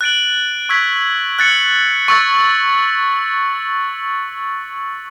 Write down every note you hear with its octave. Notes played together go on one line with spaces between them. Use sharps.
F#6 A6 D7 F#7
C#6 E6 G#6 B6
F#6 A6 C#7 F#7
C#6 E6 A6